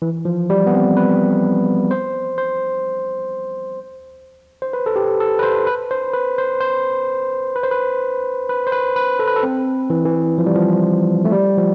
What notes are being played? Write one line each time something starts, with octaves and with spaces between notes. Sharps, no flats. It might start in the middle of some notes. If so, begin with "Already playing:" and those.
E3
F3
G3
B3
C4
B4
C5
C5
C5
B4
A4
G4
A4
B4
C5
B4
C5
B4
C5
C5
B4
C5
B4
B4
C5
B4
B4
A4
B4
A4
C4
E3
E3
F3
G3
F3
A3
G3
F3